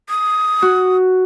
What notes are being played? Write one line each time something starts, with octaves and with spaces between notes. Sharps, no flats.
D#6
F#4